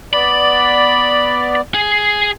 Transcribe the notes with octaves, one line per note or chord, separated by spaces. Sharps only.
B3 D5 B5
G#4